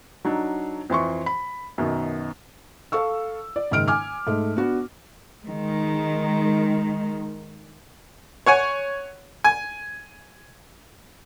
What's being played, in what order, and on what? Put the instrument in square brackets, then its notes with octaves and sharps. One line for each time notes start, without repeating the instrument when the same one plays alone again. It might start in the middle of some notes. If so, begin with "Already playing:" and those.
[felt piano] F#3 D4 D#4
F2 E3 C6 C#6
B5
F#2 B2 D#3
A4 F5 C#6 E6
D5
F#1 G#2 D#3 F6 D7
G#5 D6 F6
G#2 A3
B3 D4 F#4
[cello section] D#3 G#3
[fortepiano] C#5 F#5 G#5
G#5